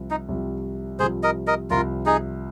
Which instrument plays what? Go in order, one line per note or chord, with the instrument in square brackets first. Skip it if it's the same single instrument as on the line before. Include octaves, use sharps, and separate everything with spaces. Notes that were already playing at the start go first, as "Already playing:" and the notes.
Already playing: [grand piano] C2 C3 F3
[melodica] D#4
[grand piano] C2 C3 F3
[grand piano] C2 [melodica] G#4 C5
[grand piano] C3 F3
[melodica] A#4 D#5
A#4 D#5
[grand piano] C2 C3 F3 [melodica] F4 A#4
[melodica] D#4 G#4